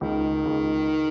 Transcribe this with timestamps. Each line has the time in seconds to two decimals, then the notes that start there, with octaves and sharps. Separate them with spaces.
0.01 C#2 D#3
0.45 C#2